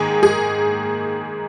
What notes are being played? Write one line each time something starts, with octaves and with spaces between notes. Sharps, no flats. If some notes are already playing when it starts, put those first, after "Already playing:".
Already playing: G#2 D#3 A#3 G#4
G#4